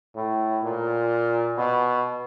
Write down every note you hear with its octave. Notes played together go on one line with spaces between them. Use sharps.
A2
A#2
B2